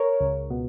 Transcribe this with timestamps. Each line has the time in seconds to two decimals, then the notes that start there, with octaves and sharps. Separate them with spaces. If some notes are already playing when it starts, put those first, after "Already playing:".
Already playing: A#4 C#5
0.20 C#2
0.50 B2